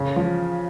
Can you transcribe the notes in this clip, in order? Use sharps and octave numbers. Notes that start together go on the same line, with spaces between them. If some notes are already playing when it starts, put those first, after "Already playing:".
Already playing: C#3
F3